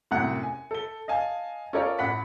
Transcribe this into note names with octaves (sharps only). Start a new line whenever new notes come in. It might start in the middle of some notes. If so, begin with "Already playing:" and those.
C2 F#2 A2 F#5
G#5
A4 G7
D#5 F5 G#5 A5
C#4 F4 A4 A#4 C#5 D5
A1 F#5 B5 B6